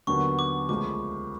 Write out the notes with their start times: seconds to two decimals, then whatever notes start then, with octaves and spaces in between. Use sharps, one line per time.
0.07 D#2 D3 F#3 B3 C#6
0.39 D6
0.69 C#2 C#3 F3 A3 D6